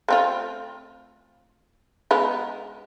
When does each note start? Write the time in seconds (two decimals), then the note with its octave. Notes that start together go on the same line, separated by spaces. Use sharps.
0.08 A3 C4 F4
2.11 G#3 B3 D#4